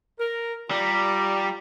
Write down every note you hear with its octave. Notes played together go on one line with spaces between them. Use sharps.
A#4
G3 F4 D5 A#5